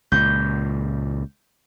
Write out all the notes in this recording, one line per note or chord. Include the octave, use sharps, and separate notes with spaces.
C#2 A#2 G6